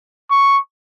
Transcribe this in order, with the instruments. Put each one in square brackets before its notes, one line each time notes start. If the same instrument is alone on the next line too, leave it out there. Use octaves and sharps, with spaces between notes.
[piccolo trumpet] C#6